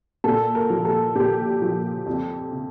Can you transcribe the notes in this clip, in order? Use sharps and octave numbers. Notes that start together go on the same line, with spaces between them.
A#2 A4
A#4
F3
A4
A#2 G4
F3
F2
C3